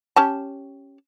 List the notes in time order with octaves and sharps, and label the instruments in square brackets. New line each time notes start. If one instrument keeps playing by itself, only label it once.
[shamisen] C#4 G4 A5